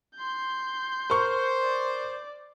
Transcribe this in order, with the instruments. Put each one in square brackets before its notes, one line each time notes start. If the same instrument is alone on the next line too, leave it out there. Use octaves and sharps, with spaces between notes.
[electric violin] C6 G6
[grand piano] A#4 C#6 [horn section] C5
[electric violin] D5